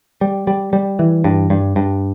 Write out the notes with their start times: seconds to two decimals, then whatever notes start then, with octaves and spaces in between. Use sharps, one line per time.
0.21 G3
0.47 G3
0.73 G3
0.99 E3
1.24 G2
1.50 G2
1.76 G2